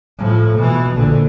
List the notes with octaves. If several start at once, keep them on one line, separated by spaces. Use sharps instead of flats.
A2 F3
B2 E3
A#1 D3